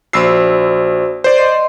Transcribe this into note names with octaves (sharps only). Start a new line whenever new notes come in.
A#1 F#4 C5 D5 E6 C7
C5 D5
D#5 C6